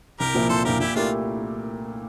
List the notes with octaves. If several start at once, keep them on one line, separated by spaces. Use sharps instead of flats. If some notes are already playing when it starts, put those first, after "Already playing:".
C2 G4 A#4
A#2 F3 A#3 E4
C2 A4 C5
A#2 F3 A#3 E4 G4 A#4
A#2 E4 G4
A3 D4 E4 F4 G4 A#4